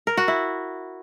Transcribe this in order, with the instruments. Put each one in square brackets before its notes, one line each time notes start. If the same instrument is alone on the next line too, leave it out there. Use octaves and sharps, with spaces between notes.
[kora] A#4
F#4
E4